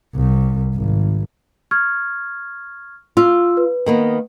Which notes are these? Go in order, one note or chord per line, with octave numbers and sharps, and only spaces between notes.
C2
G#1
C#6 F6 G#6
F4 F5 E6
B4
D#3 A#3 B3